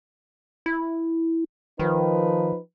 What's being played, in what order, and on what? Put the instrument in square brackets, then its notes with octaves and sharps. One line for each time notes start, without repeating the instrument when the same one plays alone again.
[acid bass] E4
[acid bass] D#3 [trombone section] F3 D#4 B4